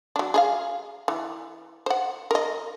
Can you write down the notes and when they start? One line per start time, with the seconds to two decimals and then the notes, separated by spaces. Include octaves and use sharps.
0.16 F#3 D4
0.34 G#4 D#5 F5
1.08 E3
1.86 C5 F#5
2.31 A#4 D#5